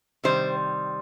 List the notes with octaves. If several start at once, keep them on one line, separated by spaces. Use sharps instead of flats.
C3 D#3 G3 C5